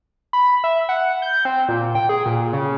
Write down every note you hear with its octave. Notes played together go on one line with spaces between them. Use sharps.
B5
E5
F#5
G6
C4
A#2
G5
G#4
A#2
C#3